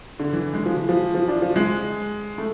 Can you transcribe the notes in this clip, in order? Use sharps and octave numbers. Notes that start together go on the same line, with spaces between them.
D3
E3
G#3
F3
E3
F3
F3
D4
F3
G#3
A3